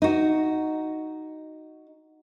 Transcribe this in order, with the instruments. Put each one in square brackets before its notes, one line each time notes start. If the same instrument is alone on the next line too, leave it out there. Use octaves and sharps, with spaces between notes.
[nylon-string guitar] D#4 F#4